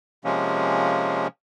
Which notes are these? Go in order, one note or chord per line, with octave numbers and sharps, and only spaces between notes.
C3 F3 G#3 A#3 C#4